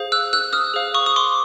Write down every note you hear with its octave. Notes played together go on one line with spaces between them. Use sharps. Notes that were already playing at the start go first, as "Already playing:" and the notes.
Already playing: G#4 C5 F5
E6 F#6
E6 F#6
D#6 F6
G#4 C5 F5
C#6 D#6
D#6
C6 D6